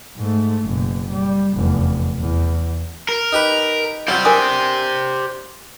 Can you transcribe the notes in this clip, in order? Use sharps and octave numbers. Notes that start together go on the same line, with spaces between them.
G#2 A3
F#1 B2
G3
F1 E2
E2
A#4
D#4 G4 B4
F#3 G3 F4 G4 C5
D4 A#4 G#5 D#6